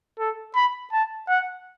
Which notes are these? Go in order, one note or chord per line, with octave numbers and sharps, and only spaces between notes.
A4
B5
A5
F#5